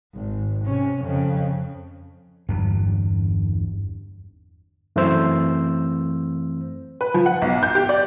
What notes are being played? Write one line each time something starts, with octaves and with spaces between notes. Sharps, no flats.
G#1
C3 C#4
F2 C#3
G1 E2 G2 F#3
F#2 E3 A3 C4 C5 E6
B4
F3
F#5
B1
G6
G4
D5